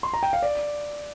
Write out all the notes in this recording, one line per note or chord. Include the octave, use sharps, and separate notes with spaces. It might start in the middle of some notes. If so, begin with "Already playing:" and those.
C6
A#5
G5
F5
D5